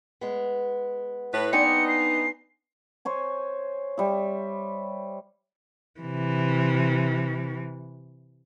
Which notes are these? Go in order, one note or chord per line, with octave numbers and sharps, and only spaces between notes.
G#3 B3
A2 B4
B3 C4 D4 D#4 G#5 C#7
C7
C5 C#5 G#5
G3 E5
C3 E3